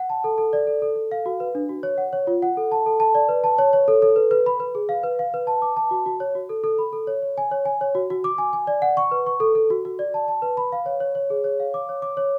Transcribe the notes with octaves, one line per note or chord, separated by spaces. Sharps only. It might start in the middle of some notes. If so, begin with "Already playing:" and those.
Already playing: F#5
A5
A4
A4
D5
A4
A4
A4
F5
F#4
B4
D4
F#4
C#5
F#5
C#5
F4
F#5
A4
A5
A4
A5
D5
B4
A5
C#5
C#5
A4
A4
B4
B4
B5
B4
G#4
F5
B4
F5
B4
A5
D6
A5
F#4
F#4
C#5
F#4
A4
A4
B5
A4
C#5
C#5
G#5
C#5
G#5
C#5
F#4
F#4
D6
G#5
G#5
D5
F#5
C#6
B4
C#6
A4
A4
F#4
F#4
D5
A5
A5
B4
B5
F5
C#5
C#5
C#5
G#4
C#5
F5
D6
C#5
D6
C#5